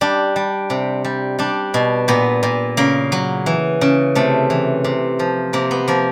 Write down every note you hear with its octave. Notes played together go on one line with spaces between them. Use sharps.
G3 D4
G3
C3
G3
G3 D4
B2
A#2 B3
A#2
C#3 A#3
F#3
E3
C#3
C3 A3
E3
C3
F3
C3 A#3
B3
F3 A#3